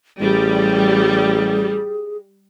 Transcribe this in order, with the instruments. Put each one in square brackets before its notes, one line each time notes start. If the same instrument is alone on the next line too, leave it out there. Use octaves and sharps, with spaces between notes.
[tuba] A1 [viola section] G3 [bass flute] G#4